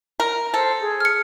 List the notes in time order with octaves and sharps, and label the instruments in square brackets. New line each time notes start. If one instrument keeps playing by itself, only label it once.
[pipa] A#4
[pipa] A4 [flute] C5
[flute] G#4
[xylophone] F6 C#7